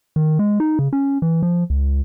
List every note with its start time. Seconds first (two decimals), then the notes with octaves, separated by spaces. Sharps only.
0.16 D#3
0.39 G#3
0.60 D#4
0.79 C#3
0.93 C#4
1.22 E3
1.43 F3
1.70 C#2